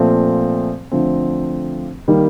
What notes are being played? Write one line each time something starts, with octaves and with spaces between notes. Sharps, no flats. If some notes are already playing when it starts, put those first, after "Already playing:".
Already playing: A#2 F3 A3 C4
D3 F3 A3 C4
D#3 G3 A#3